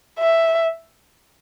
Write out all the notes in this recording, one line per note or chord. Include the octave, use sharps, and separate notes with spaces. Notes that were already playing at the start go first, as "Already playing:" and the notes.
E5